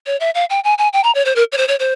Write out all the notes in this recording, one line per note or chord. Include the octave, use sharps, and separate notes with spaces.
C#5
E5
F5
G5
G#5
G#5
G5
A#5
C#5
C5
A#4
C#5
C5
C#5
C5